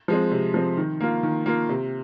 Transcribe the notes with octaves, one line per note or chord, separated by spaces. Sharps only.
F3 G#3 C4
C3
F3 G#3 C4
D#3
A#3 F4
D#3
A#3 F4
C3